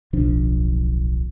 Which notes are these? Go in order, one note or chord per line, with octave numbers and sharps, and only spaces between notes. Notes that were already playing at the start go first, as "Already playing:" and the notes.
D1 B1 F3 D4